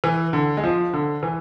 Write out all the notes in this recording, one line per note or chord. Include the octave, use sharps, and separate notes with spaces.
E3
D3
G#3
F3
D3
E3